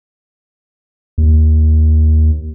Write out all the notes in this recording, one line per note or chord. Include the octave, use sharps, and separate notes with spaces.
D#2